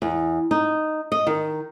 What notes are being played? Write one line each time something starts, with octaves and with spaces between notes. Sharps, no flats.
E2
D#4
D#5
D#3